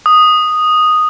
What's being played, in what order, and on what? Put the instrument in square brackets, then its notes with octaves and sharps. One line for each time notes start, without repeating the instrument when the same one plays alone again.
[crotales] D#6